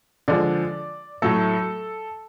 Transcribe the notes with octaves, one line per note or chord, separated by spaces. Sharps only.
D3 F3 G#3 D5
A2 F#3 A3 A4